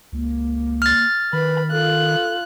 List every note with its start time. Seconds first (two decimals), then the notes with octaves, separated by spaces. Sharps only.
0.13 C#2 A#3
0.82 F6 A6
1.33 D#3 B4 B5
1.72 F4 A4 F#6